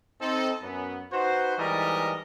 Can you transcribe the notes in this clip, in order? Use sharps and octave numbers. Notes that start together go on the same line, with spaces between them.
C4 D#4 A4
F#2 B3
D#4 F#4 B4 C5
G#2 E3 G3 A4 A#4 D#5